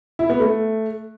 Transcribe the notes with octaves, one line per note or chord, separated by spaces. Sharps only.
E4
B3
A3